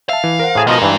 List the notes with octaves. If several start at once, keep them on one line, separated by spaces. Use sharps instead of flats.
E5 F5 A5
E3
A#4 C5 F#5
A2 G#4 A5
B2 F3 G#3 D#4 D#5
G2 E3